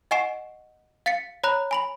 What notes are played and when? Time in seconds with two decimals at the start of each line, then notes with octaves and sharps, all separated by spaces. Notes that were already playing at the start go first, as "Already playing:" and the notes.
0.11 D#5 F#5 G#5 C#6 C7 E7
1.06 F5 A6 B6 C#7
1.44 C#5 A#5 B5 F#6
1.71 G#5 B5 F#7